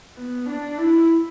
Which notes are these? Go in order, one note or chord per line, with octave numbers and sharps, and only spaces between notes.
B3
D4
E4